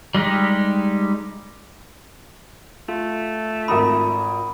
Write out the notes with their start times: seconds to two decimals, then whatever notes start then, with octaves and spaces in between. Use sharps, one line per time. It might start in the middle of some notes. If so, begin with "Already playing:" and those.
0.15 G3 G#3 D#4 G4
2.88 A3 F4
3.68 G#1 A#4 B5 D#6